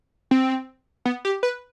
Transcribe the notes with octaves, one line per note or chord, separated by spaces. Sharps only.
C4
B3
G4
B4